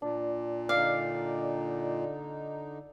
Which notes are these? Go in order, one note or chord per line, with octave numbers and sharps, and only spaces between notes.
A#2 D4
D3 D#4 D5 F5